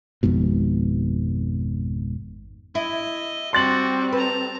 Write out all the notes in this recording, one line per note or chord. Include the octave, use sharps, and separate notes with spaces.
G#1 F2 G#2 B2
E4 D#5 E5
G3 C4 F#4 C6 D6 A6 F#7
B4 A5 A#5